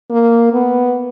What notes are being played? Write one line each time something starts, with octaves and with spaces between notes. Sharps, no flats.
A#3
B3